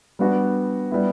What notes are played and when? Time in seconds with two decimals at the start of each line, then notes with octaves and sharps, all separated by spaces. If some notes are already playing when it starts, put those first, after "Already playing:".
0.19 G3 B3 D4 F#4
0.91 G3 B3 E4